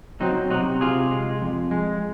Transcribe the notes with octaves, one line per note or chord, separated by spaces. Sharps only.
F#3 C4 D#4
C3 D#4 F#4
C3 F4 G#4
G#3
F2
G#3